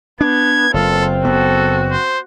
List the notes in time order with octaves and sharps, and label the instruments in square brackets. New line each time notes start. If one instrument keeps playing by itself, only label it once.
[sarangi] B3 [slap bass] D4 [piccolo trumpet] G#6
[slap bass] F#1 [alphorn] C4 [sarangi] F4 [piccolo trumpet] A4
[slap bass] F#1 B3 [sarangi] F#4 [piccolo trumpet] A4
[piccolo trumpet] C5